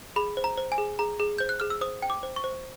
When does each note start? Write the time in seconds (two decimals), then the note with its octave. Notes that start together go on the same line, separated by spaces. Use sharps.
0.16 G#4 B5
0.37 C5
0.44 A#5
0.58 C5
0.72 G#5
0.78 G#4
0.99 G#4 A#5
1.20 G#4
1.38 C5 G6
1.49 F#6
1.60 G#4 F6
1.70 E6
1.81 C5 D#6
2.02 G5
2.10 D6
2.23 C5
2.36 C#6
2.44 C5